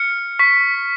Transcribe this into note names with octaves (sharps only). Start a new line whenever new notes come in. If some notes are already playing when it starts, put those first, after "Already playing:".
Already playing: F6 C#7
C#6 B6